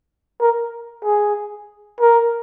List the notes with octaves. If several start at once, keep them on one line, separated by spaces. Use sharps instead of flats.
A#4
G#4
A#4